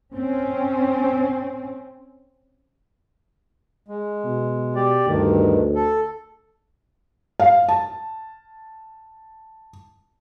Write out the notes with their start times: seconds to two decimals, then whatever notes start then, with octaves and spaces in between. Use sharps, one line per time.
0.15 C4 C#4
3.88 G#3
4.25 B2
4.75 G4 D5
5.06 D2 G2 D#3
5.75 A4
7.40 F5
7.69 A5